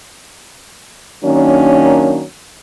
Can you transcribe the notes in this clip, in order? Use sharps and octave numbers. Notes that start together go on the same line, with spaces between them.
D#3 F#3 A#3 C#4 D4